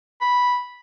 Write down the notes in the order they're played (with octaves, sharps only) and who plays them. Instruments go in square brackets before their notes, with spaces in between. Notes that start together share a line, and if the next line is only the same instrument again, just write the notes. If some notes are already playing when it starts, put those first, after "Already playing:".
[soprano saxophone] B5